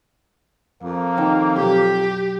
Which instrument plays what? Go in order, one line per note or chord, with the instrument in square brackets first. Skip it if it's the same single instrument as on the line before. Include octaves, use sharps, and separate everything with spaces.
[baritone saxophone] F2 [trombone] A#3
[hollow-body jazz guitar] D#2 D#3
[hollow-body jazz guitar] B1 [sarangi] G4